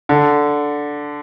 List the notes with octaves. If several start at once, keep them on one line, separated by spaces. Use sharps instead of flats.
D3